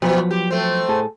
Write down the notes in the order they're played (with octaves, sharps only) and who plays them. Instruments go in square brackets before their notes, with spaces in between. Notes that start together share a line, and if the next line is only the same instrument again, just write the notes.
[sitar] B2 [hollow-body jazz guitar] F3 F#3 B3
[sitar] G4
A3 C4
[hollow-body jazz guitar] A2 G#4 A4